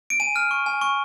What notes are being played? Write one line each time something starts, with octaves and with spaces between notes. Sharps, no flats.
D7
G#5 D#7
F6
C#6
G#5
C#6